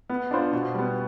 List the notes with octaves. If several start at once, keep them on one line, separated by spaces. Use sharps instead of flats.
B3
D4 F4 C5
B2
G3 B3